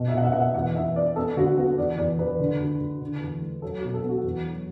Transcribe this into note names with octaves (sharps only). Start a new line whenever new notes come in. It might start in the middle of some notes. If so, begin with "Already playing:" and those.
Already playing: B2
E5
B2 F#5
E5
B2 F#5
E5
E2 F#5
E2 E5
B3 D5
B3 A4
D2 F#4
B3 F#4
E2 D5
E2 D5
E2 B4
D3
D2
D2
D3
E2
A3
F#3 A4
F#4
B2
A4
B3
F#4
E2
F#3